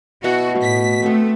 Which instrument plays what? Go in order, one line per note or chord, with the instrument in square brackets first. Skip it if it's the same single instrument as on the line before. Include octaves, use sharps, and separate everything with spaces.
[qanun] B2 E4 F#5 [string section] F#4
[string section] A2 B6
[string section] A3 [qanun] B3 C4